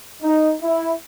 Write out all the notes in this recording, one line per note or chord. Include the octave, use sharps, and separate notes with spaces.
D#4
E4